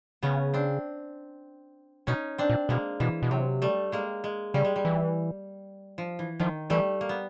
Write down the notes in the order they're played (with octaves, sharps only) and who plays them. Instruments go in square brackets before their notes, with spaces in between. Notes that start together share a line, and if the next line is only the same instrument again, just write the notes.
[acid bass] C#3 [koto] B3 C#4
[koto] C4 D4
[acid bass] B2 [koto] C#4 D#4
[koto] C4 D4
[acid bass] A#2
[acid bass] B2 [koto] G#3 A#3
[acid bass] B2 [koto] E3
[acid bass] B2
[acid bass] C3 [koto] F#3
[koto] G3 A3
G#3 A#3
G#3
[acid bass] C#3 [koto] G3
[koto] G#3
G3
[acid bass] E3
[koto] F3
E3
[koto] D#3 [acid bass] F3
[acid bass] E3 [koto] G3 A3
[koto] A#3
B3